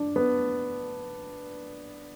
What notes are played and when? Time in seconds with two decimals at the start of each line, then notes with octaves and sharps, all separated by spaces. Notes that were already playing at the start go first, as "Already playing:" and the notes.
Already playing: D4
0.16 B3